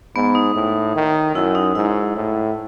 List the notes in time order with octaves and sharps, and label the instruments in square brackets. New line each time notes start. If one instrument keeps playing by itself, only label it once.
[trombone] G#2 [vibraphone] B3
[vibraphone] D#4
[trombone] A2
D#3
[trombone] F#2 [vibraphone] E4
[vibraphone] D#4
[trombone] G#2 [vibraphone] E4
[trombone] A2